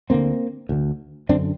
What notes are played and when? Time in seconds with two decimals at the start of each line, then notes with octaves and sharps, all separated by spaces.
0.10 D2 D3 A#3 C4
0.69 D2 D3
1.29 F#2 D3 C4 D4